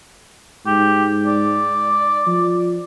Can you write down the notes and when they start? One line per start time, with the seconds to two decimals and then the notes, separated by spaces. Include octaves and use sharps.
0.66 G#2 G4
1.26 D5
2.27 F3